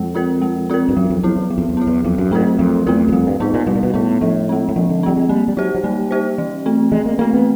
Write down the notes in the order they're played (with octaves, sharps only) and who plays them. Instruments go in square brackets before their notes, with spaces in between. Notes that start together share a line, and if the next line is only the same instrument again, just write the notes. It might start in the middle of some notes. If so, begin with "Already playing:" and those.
Already playing: [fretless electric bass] F2 [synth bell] G#3
[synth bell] C4 F4 A#4
G#3
C4 F4 A#4
[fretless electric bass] G2
[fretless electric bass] F#2 [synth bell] F#3
[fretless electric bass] F2
[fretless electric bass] F2 [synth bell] B3 E4
[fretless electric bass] E2
[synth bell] F#3
[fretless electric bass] F2
E2
[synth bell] B3 E4
[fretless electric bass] E2
[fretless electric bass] F2 [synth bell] F#3
[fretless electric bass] F#2
[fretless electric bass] G#2 [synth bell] A3 C4 F4 A#4
[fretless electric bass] F2 [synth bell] F#3
[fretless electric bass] E2 [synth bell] A3 C4 F4 A#4
[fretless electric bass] E2
[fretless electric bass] F2 [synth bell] G3
[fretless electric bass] G2
[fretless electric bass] G#2 [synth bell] B3 D#4
[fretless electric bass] A#2
[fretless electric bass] B2 [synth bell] G3
[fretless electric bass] A#2
B2
[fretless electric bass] A2 [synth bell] B3 D#4
[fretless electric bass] A2 [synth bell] F3
[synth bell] G#3 C4
[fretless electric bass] A2
[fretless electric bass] A#2 [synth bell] F3
[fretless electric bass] D3
[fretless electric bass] G3 [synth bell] G#3 C4
[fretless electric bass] G#3
[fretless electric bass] G3 [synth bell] A#3
[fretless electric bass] G3
[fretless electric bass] F#3 [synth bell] D#4 G4 C5
[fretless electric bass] F#3
[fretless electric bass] G3 [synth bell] A#3
[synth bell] D#4 G4 C5
E3
A3 C4
[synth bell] E3 [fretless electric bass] G#3
[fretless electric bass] A#3
[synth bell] A3 C4 [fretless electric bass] A#3
[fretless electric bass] B3